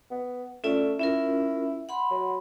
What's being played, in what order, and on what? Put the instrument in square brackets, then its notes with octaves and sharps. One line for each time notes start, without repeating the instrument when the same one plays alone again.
[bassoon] B3
[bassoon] A3 [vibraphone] C#4 F4 D5
[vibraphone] C#4 F4 A#4 [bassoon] E4
[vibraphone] F#5 B5 C6
[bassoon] F#3